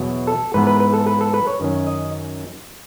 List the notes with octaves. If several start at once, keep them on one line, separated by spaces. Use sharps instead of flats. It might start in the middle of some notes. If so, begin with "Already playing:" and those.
Already playing: E2 B2 F#3
A4
G#2 E3 B3 B4
B4
B4
A4
B4
A4
B4
C#5
F#2 D#3 F#3 C#4
D#5